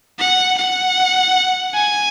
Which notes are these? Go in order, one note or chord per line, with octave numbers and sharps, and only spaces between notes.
F#5
F#5
G#5